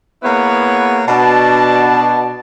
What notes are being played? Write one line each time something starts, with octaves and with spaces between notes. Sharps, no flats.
A#3 B3 E4 G#4 B4 C#5
B2 D4 A5